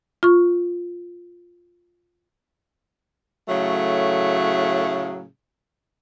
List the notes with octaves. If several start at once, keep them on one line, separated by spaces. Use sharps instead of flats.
F4 C#6
A2 C#3 F#3 A3